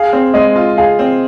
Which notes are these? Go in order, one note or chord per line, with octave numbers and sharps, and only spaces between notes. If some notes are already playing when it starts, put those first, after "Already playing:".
Already playing: G#4 F5
C4
G#3 D#5
F4
G#4 F5
C4